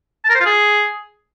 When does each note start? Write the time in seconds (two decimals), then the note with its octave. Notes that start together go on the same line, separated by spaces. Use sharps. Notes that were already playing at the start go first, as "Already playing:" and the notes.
0.24 A5
0.30 A#4
0.35 C5
0.40 F4
0.46 G#4